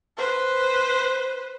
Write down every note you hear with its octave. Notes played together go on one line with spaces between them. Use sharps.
B4 C5